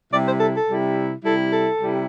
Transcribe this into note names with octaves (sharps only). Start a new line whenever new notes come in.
C3 G3 E4 D5
C5
A4
A4
C3 G3 E4
C3 G3 E4 A4
A4
C3 G3 E4